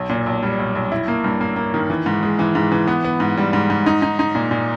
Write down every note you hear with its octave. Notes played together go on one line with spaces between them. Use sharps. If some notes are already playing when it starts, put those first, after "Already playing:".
Already playing: B1
A#2
B1
G3
B1
B1
E4
A#3
G2
A#3
A#3
D#3
E3
G#2
G#3
E3
G#2
E3
B3
B3
G#2
G3
G#2
G#2
D#4
D#4
D#4
A#2
A#2